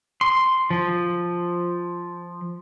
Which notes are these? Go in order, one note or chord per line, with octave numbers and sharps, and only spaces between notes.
C6
F3